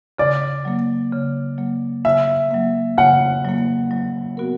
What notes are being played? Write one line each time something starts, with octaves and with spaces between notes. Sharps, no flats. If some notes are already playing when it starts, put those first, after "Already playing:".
C#3 D5
F#3 A#3
C#3
F#3 A#3
C#3 E5
F#3 A#3
C#3 F#5
F#3 A#3
F#3
B3 F#4 A#4